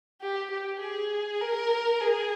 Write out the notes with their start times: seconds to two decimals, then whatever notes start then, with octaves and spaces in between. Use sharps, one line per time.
0.21 G4
0.51 G4
0.80 G#4
1.41 A#4
2.01 G#4